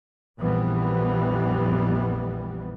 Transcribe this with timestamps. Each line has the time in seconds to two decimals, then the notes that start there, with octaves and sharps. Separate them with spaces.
0.40 A#1 F2 E3 G3 B3